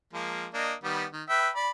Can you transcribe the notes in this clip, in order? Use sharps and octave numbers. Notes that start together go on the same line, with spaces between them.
F3 G#3 A#3
A#3 D4 D#5
D#3 G3 B3
D#3
B4 E5 G5
D5 B5